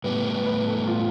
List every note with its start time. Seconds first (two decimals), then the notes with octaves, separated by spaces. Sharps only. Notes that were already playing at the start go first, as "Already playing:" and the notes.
0.04 A2 G3 B3 B4
0.25 B4
0.46 B4
0.67 A4
0.87 F4